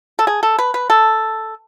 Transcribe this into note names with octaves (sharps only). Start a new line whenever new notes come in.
A4
G#4
A4
B4
B4
A4